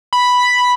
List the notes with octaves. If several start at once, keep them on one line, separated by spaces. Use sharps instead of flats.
B5